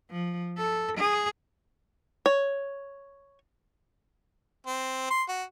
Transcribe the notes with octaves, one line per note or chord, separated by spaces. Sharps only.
F3
A4
G#4
C#5
C4
C6
F#4